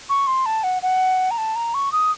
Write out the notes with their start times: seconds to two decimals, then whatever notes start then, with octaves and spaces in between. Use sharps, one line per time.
0.09 C#6
0.27 C6
0.46 A5
0.63 F#5
0.82 F#5
1.31 A#5
1.38 A5
1.56 A#5
1.74 C#6
1.92 D#6